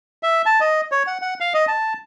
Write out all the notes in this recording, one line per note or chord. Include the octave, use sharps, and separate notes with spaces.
E5
A5
D#5
C#5
F#5
F#5
F5
D#5
A5